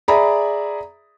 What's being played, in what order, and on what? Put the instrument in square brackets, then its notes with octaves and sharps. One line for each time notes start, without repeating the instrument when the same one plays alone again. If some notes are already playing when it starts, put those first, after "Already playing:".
[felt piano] G#4 D5 E5 A#5 B5